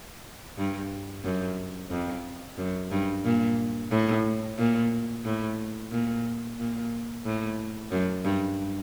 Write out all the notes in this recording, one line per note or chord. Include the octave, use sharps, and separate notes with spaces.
G2
F#2
F2
F#2
G2
A#2
A2
A#2
A2
A#2
A#2
A2
F#2
G2